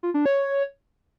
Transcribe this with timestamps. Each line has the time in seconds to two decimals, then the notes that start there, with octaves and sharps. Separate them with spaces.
0.03 F4
0.14 D4
0.26 C#5